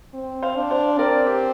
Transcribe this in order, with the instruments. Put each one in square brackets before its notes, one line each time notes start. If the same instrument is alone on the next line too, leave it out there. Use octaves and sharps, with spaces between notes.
[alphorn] C4
[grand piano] C5 F5
[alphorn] D4
[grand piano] C5 F5
[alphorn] C4 [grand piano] A#4 D5
[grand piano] G4